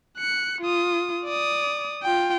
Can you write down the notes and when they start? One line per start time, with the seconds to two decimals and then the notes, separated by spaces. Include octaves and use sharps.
0.17 F#6 C#7
0.61 F4 D#6
1.24 D5 D#6
2.03 F4 G5